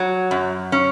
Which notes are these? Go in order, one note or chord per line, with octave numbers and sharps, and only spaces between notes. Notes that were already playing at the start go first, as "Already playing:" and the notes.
Already playing: F#3
F#2
C#4